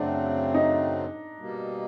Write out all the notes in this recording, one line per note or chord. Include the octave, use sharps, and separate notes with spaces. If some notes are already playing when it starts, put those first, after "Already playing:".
Already playing: F#2 C#3 F#3 A3 C4 D4
D#4
B2 G3 A#3